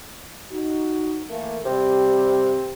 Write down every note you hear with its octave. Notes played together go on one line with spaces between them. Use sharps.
D#4 F#4
E3 A3 A#3
C3 G3 C4 G4